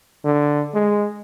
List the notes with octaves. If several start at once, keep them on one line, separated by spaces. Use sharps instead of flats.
D3
G#3